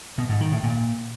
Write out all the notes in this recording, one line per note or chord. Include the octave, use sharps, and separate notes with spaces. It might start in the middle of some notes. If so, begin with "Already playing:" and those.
B2
G#2
D#3
A2
A#2